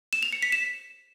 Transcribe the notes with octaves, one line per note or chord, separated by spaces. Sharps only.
E7
F7
C#7
B6
E7